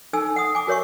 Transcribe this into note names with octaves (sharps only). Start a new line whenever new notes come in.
D#4 A4 G#5 E6
F#5 D#6
G#5 D6
F#4 A#4 C#5 E5 C#6